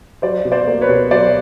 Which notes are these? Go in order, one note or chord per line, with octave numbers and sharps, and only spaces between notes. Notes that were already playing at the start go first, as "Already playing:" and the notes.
F#3 C5 D5
B2
C5 D5
A#3
B4 C#5
B2
F#3 C5 D5